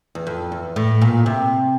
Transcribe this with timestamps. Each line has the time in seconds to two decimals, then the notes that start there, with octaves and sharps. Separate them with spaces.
0.15 E2
0.27 F2
0.52 E2
0.76 A2
1.01 A#2
1.26 C3